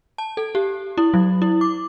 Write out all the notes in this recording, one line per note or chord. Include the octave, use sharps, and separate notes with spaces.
A5
A4
G4
E4
F#3
E4
D6